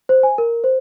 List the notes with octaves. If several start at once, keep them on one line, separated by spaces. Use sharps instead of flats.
C5
G#5
A#4
C5